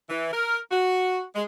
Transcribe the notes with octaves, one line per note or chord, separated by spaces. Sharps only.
E3
A#4
F#4
G#3